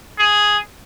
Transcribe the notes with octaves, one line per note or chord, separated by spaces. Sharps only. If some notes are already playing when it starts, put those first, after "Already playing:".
G#4